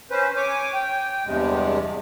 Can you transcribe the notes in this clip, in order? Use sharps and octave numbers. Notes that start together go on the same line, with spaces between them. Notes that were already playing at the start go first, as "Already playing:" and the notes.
C#4 B4 C5
C#5 G#5 D6
G5
E2 G2 C3 G#3